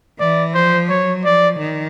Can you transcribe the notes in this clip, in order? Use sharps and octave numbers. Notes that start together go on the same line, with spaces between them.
E3 D5
F3 C5
F#3 C#5
F3 D5
D#3